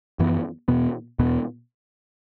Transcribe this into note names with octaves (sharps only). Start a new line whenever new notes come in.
F#2 E3 B3
E2 B2 B3
E2 B2 B3